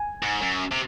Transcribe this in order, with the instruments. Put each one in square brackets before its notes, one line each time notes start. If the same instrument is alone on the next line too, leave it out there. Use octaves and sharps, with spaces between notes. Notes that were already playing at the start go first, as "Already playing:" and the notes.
Already playing: [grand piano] G#5
[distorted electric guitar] G#2
F#2
C3